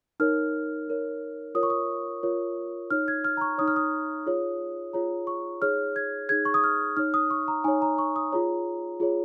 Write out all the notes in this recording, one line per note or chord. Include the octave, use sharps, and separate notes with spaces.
D#4 A#4 C#5 F6
D#4 A#4 C#5
F4 A#4 C#5 D#6
C#6
D#6
F4 A#4 C#5
D#4 C#5 F6
G#6
F6
A#5
C#6
D#4 C#5 D#6
F6
D#6
F4 G#4 C#5
F4 G#4 C#5 A#5
C#6
D#4 G#4 C#5 F6
G#6
D#4 G#4 C#5 G#6
C#6
D#6
F6
D#4 C#5 F6
D#6
C#6
A#5
D#4 C#5 G#5
A#5
C#6
D#6
F4 G#4 C#5 A#5
F4 G#4 C#5